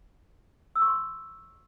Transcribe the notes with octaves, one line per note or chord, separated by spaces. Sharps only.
E6
C#6
C6